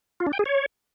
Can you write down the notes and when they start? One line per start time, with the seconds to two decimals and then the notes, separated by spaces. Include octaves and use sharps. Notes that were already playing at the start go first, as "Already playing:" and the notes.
0.20 F4
0.27 D4
0.33 G5
0.39 G#4
0.46 C#5